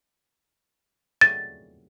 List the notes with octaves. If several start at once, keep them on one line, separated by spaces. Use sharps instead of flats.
A6